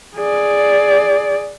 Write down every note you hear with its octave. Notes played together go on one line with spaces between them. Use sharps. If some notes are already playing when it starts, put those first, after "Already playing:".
G#4 D5